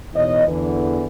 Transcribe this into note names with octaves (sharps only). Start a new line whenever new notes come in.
E2 B2 D#4 C#5 D#5
E2 D3 E3